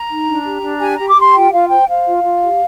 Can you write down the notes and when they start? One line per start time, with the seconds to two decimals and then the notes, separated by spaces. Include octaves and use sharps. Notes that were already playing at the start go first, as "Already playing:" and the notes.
Already playing: A#5
0.09 D#4
0.26 D4
0.44 G4
0.62 D4
0.80 G4 G#5
0.94 G4 A#5
1.07 D6
1.16 G4 C6
1.34 F4 G5
1.52 F4 F5
1.69 C5 G5
1.88 C5 F5
2.06 F4
2.23 F4
2.42 G4